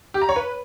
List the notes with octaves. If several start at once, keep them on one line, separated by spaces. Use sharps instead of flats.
G4
A#5
C#5
B4